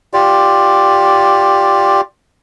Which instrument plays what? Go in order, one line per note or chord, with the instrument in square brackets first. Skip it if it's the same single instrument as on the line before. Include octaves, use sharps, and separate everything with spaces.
[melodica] F4 G4 D5